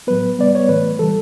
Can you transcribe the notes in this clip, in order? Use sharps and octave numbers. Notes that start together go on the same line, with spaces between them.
A2 F#3 B3 B4
C#3 G3 B3 D5
C#5
A2 E3 A3 B4
C#3 E3 G3 A4